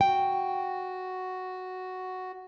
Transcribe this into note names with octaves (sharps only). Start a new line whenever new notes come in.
F#4 G5